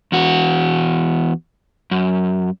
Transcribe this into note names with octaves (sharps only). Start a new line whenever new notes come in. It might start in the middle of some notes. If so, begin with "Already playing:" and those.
E2 F#4
F#2